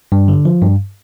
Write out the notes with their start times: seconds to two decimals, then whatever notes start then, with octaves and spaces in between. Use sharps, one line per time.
0.12 G2
0.28 D3
0.45 F3
0.62 G2